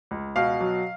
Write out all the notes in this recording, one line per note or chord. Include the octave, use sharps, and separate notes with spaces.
C#2
B2 F5
F#3